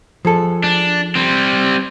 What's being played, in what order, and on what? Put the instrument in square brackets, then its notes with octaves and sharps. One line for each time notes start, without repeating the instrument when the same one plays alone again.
[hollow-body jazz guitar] F3 G#4 A4
[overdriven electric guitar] D4
G3 C4